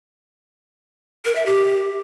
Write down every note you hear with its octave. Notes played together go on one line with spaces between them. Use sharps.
A#4
E5
G4